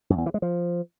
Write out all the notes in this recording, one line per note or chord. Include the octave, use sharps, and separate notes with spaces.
F#2
E2
E3
G#3
F3